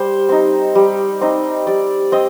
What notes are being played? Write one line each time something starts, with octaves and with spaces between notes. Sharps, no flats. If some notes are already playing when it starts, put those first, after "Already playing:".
Already playing: G3 C5
C4 D#4
G3
C4 D#4
G3 D5
C4 D#5